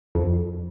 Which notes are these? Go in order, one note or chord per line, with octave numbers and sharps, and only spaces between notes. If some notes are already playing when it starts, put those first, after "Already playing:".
F2